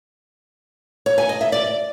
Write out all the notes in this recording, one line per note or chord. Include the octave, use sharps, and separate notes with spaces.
C#5
G#5
D#5
E5
D5